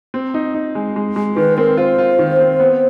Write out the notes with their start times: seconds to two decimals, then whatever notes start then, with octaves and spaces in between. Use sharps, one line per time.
0.14 C4
0.34 D#4
0.54 D#4
0.75 G#3
0.96 G#3
1.16 G#3
1.36 D#3 B4
1.58 C4 A#4
1.77 F4 C5
1.98 F4
2.19 D#3
2.40 C4
2.60 B3